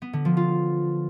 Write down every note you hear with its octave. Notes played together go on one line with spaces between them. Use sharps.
B3
D3
F3
F4